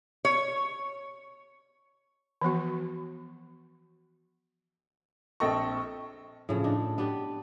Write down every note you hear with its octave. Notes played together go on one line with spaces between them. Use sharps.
C#5
E3 F3 B3 F#4
A#1 C4 A4 D#5 C#6
A2 C#3 F3
D4 D#4
B3 D4 G4